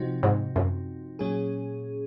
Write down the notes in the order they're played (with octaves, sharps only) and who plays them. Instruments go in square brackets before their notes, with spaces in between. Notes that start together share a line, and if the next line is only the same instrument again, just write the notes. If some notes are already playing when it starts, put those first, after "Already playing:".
Already playing: [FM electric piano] C3 F3 C4 D#4 F#4
[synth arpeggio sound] G#2
F#2
[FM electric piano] A#2 F#3 C#4 G#4